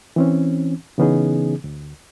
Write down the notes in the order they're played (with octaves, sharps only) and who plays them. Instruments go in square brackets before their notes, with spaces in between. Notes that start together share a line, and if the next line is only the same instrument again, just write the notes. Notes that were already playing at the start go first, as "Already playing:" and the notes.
[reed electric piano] E3 C4 C#4
C#3 E3 B3 C#4 D#4 G#4
D2